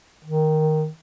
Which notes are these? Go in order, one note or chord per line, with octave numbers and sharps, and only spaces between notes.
D#3